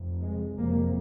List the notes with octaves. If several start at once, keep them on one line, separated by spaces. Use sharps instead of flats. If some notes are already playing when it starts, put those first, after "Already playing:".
Already playing: F1 F2 C3
G#3
F#1 F2 C3 A#3